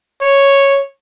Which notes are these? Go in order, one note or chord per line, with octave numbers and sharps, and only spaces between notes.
C#5